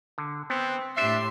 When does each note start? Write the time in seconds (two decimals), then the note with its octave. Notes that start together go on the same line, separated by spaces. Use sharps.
0.18 D3
0.50 B3 C4
0.97 A2 D4 G4 C5 E5 C6